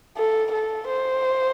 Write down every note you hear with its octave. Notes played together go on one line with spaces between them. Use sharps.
A4
A4
C5